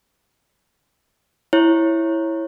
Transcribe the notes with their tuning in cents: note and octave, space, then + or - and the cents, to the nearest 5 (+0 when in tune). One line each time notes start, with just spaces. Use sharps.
E4 +0 C#5 -20